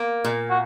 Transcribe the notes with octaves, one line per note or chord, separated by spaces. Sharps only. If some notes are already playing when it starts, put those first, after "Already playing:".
Already playing: A#3
A#2
F#4